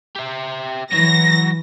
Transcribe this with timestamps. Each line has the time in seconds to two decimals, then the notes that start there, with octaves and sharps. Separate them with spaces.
0.16 G4 E5
0.92 E3 F#3 A#6